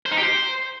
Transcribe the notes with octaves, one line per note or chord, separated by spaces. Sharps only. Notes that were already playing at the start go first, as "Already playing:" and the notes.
C5
D#4
G4
C5